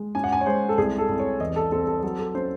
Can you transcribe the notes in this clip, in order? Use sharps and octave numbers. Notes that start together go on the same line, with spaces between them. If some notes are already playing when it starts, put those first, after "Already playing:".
Already playing: G#3
C#4 G#5
F#5
G#5
C#5
G#3 C5
A4
C2 G#4
A4
C2
C#5
E2 D#5
A4
C4 A4
A4
F#3 A4
A4
C#4 C5